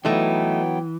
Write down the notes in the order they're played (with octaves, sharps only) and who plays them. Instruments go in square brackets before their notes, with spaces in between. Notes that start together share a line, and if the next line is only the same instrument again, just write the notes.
[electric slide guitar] E3 [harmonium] F#3 B3 G5 [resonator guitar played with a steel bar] A3 D#4